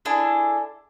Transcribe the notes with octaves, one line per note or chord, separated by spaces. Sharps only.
D4 E4 G#4 A4